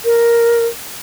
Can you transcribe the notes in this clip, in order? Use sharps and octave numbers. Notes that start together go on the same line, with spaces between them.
A#4